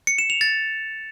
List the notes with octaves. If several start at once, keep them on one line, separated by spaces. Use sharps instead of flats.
C#7
E7
F7
A6